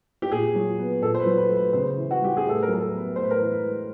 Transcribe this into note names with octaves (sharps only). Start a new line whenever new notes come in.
G4
A#2 G#4
F#3
B3
A#2 A4
C5
B4
F#3
B4
A3
B4
C#3 C5
E3
F#4
G3 G4
G#4
A2 A4
A#4
F#3
A#4
A4
B3
B4
A2 C5
B4
A#4
E3 B4
B4
G#3